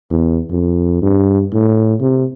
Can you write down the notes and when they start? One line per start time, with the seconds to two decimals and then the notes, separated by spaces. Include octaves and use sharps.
0.11 E2
0.51 F2
1.02 G2
1.53 A2
2.01 C3